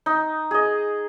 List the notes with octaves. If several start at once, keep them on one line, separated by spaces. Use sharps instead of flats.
D#4
G#4 D#5